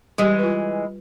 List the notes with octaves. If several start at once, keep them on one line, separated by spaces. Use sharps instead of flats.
E3 G3 G#3 G4
F4 B4